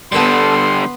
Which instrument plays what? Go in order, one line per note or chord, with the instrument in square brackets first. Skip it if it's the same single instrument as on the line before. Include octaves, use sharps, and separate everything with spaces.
[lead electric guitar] D3 G3 [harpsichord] B3 B4 A5 [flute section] A4 [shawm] C6